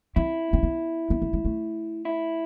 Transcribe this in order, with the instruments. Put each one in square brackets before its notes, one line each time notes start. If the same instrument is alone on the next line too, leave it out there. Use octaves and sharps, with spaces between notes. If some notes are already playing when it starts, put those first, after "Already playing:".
[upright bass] C4 [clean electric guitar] E4
[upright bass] C4
B3
B3
A3
G#3
A3
[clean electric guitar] E4